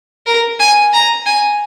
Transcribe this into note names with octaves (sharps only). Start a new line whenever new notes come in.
A#4
G#5
A#5
G#5